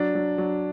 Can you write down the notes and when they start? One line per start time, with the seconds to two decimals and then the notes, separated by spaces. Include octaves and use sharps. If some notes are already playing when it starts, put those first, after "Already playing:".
Already playing: F#3 D4
0.15 F#3
0.38 F#3